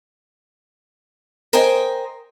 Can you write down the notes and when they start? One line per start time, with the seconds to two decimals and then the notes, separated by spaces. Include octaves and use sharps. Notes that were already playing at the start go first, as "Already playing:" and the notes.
1.53 A#4 C5 D#5 G5 G#5